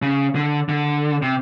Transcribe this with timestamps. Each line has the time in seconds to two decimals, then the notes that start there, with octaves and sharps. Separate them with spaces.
0.02 C#3
0.35 D3
0.69 D3
1.22 C3